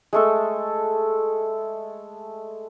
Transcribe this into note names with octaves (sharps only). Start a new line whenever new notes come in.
G#3 A3 A4